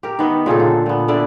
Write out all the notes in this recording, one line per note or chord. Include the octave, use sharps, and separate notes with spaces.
G4 A#4
D#3 B3 D#5 E5
A#2 C#3 D#4 A4
D3
A#2 B3
D3 E4 D5